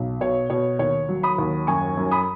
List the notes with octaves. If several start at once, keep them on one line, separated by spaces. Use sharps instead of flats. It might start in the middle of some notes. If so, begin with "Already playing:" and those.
Already playing: B1
B2 C#5
B2 C#5
D#2 C#5
F#3
B5 D#6
D#2
F#2 G#5 C#6
F#2
B5 D#6